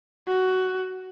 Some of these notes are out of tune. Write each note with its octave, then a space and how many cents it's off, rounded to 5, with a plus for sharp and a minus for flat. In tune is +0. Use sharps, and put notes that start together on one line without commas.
F#4 +10